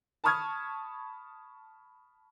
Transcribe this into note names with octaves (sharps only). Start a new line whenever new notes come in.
A5 B5 C#6 D#6 F6 G#6